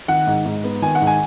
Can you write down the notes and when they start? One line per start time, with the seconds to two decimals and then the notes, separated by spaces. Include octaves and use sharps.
0.08 D#3 F#5
0.27 G#2
0.45 G#2
0.64 B3
0.82 D#3 G#5
0.95 F#5
1.01 G#2
1.07 G#5